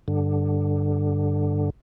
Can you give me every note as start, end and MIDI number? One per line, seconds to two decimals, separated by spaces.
0.08 1.70 43
0.08 1.70 50